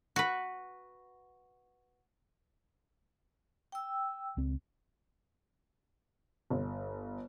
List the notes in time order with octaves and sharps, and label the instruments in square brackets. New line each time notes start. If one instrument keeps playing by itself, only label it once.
[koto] F#4 B4
[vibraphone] G5 E6
[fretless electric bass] C#2 C4
[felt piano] G1